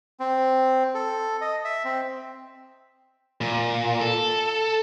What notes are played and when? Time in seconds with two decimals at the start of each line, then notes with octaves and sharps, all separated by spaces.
0.20 C4
0.95 A4
1.41 D#5
1.65 E5
1.85 C4
3.41 A#2
4.00 A4